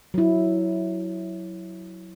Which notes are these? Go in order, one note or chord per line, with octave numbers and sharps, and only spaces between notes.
F#3 E4